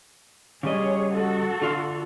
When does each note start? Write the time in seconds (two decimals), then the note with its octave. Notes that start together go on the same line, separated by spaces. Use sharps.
0.63 C#3 G3 G#4 C#5 D#5
1.12 F#4 A4
1.62 D3 F4